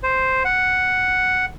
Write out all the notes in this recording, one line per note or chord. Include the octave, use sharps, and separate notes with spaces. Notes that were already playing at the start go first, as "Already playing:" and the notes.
C5
F#5